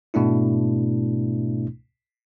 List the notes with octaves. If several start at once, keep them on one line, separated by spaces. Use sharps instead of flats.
G#2 B2 A3 D4 E4